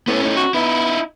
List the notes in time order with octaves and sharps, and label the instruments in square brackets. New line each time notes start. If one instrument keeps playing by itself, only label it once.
[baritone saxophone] A2 [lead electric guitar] B3 C#4
[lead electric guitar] C#4 D#4
[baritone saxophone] F#4
[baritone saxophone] B3 [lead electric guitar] D#4 E4